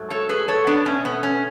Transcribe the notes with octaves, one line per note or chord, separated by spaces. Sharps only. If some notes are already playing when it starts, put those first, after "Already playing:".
Already playing: G#2 F#3 A3
A4 C#5
G#4 B4
A4 C#5
B3 D4
B2 A3 C#4
B3
C#4